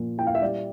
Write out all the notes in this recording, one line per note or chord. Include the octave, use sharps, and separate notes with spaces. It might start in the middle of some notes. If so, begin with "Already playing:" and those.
Already playing: A#2 F3 F4
E4 G5
F5
E5
G3 D5